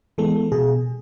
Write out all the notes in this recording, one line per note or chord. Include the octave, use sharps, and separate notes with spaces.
E3 G#3 B3 A4
B2 G#4